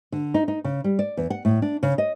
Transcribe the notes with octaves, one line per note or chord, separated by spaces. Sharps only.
D3
D#4
D#4
C#3
G3
D5
E2
F#5
A2
D4
C#3
D#5